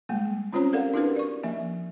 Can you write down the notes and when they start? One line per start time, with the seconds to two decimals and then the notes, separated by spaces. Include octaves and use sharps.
0.09 G3 G#3 A#3
0.53 C4 C#4 F4 C5 C#5 A#5
0.73 G4 A4 A#4 D5 F5 F#5
0.94 D4 E4 F#4 G4 A#4 B4
1.16 D5 C#6
1.43 F3 A#3 E5